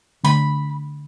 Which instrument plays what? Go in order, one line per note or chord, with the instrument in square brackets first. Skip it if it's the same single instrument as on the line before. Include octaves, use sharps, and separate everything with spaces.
[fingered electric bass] D3 A3 D4 [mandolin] B5